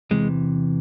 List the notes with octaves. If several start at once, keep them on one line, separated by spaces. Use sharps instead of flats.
E2 C3 E3 G#3